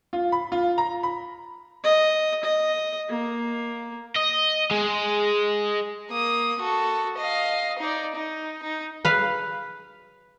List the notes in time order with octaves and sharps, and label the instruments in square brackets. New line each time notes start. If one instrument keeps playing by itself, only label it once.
[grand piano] F4
B5
F4
A#5
B5
[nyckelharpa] D#5
D#5
A#3
[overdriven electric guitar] D#5
G#3
[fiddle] A#3 D#6
F#4 A4
D#5 F5
D#4 D5
D#4
D#4
[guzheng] B4 F5